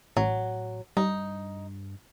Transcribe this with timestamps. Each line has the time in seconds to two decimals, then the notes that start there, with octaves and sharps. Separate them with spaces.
0.17 A1 F#3
0.97 G2 D#4